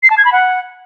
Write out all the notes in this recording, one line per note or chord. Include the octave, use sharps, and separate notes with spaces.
C7
A5
G#6
B5
F#5